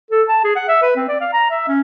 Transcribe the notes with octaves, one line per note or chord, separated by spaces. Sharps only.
A4
A5
G#4
F#5
E5
B4
C4
D5
F5
A#5
E5
C#4